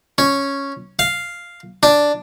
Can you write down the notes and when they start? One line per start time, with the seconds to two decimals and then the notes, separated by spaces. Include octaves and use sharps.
0.18 C#4
0.99 F5
1.83 D4